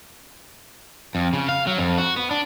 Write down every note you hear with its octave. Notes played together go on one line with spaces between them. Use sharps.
F2
C#3
F5
F#3
F2
F#4
B3
D4